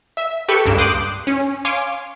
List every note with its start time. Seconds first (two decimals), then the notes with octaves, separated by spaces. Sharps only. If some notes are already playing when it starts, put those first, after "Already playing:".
0.17 E5
0.49 G4 A4 B4 C#6
0.65 C#2 G2 A#3 E7
0.78 C6 D6 D#6 F#6 G6 C7
1.27 C#4
1.65 C#5 F5 G#5 C6 D6